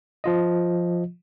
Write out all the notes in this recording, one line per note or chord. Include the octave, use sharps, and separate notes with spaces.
F3 F4 D#5